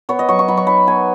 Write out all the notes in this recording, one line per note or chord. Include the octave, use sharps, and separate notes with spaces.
B3 C#5
D#5
F#3 C#6
C#6
F#3 B5
C#6
D#4 B5
B3 G#5